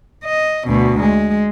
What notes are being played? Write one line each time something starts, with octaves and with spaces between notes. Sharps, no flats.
D#5
D2 B2
G#3